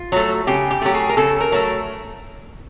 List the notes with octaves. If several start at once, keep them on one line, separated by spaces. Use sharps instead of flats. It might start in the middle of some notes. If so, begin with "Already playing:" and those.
Already playing: F4
F#3 A3
C#3 G4
G4
F#3 A3 G4
G#4
A#4
C#3 A4
A#4
F#3 A3